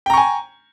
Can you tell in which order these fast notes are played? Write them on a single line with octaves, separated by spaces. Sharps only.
G5 A#5 C#6 G#5